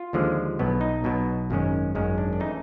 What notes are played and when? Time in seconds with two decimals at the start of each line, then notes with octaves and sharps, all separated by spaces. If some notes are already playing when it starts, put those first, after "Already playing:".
Already playing: F4
0.13 D#2 D3 F3 G#3
0.59 B1 B2 F#3 B3
0.81 D#4
1.04 B1 B2 F#3 B3
1.50 G#1 F#2 D#3 G#3 C#4
1.95 G#1 F#2 D#3 G#3 C#4
2.18 D4
2.33 D4
2.40 E3 A3 C#4 D#4